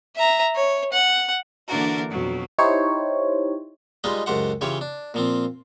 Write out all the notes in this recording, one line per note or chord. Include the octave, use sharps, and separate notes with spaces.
E5 A#5
C#5
F#5
D3 E3 A#3 D4 F#4 A#4
F2 B2 F#3
D#4 E4 G4 C5 C#5
G3 G#3 D#4 F4 B4 D#5
C#2 F#2 G4 C5 F#5
C#3 E3 F4 G4 C#5 G5
D4
A#2 F3 C4